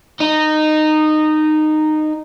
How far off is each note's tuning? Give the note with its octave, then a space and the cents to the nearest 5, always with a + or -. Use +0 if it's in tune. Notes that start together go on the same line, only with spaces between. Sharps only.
D#4 -15